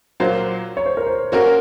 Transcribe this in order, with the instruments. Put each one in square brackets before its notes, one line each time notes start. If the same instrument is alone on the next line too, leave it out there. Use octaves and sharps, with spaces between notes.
[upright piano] A#2 F#3 A#3 F4 C5
[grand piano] C#5
C5
A#4
C5
[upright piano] A#3 C#4 F#4 A#4 [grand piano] C5